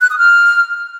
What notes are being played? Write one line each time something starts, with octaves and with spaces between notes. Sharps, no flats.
F#6
D#6
F6